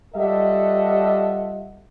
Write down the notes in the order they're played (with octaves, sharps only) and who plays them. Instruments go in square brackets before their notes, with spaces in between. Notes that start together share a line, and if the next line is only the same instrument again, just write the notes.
[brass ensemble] G3 F4 A4 D#5 E5 F#5